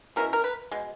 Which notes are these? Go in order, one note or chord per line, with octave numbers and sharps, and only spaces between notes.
B2 G#3 C#4 E4 A#4
A#4
B4
B2 G#3